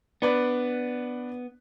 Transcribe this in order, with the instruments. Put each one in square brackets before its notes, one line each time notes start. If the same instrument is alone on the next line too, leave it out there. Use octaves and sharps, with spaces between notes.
[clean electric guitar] B3 [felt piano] D4 B4 D5